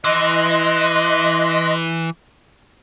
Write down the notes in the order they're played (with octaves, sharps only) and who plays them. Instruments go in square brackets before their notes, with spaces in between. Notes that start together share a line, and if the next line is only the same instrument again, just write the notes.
[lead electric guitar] E3 [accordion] D#5 C6 F#6